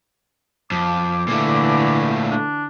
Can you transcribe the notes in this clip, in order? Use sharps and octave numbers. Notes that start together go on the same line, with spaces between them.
F2 D6
A#2 D3 E3 A3
D4